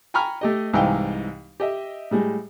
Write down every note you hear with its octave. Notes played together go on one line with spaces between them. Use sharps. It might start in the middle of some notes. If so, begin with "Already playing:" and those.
G5 G#5 A#5 B5 C#6 F6
A3 G4 D#5
C2 G#2 E3 D#4 F5 G5
G4 D#5 E5
A2 G3 G#3